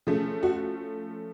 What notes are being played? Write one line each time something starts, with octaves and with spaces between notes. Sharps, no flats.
F3 A3 C#4 G#4
F#4